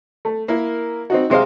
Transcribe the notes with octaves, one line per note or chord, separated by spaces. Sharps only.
A3
A#3 E4 A#4
C4 D#4 F#4
C3 G#3 C5 D#5 F5